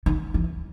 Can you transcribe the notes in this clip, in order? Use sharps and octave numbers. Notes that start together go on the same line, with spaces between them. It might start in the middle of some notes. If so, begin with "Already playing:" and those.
D#3
E3